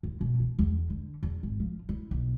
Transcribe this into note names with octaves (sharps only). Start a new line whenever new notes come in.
D#2
B2
E3
E2
D3
E2
G#1
F3
E4
B1